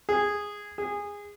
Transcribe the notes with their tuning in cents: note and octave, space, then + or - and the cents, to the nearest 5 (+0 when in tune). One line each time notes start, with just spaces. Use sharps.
G#4 -10
G#4 -20